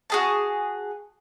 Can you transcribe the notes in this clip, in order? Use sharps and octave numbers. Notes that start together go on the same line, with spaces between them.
F#4 G#4 A5